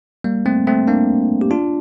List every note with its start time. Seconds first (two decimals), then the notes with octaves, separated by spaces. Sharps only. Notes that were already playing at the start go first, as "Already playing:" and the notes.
0.24 G3 A#3
0.46 A3 C4
0.67 A3 C4
0.88 A#3 D4
1.41 G4
1.51 D4 F4